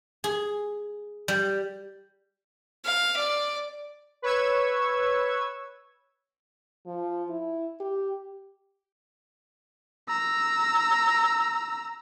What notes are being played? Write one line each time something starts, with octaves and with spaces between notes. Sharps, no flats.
G#4
G3
F5
D5
B4 C#5 C#6 E6 G#6
F3
E4
G4
A#5 E6